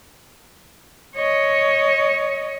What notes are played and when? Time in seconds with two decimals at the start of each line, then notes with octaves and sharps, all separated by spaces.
1.16 C#5 D#5